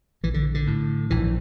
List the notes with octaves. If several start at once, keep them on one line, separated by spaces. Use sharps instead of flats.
A#1 E3
D3
D3
A2
A#1 E3